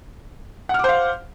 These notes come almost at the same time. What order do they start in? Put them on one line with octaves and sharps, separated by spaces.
F#5 F6 D6 C5 F5